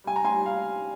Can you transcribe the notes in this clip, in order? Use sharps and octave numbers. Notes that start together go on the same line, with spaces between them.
G3 G#5
A#5
G#5 C6
G3
F5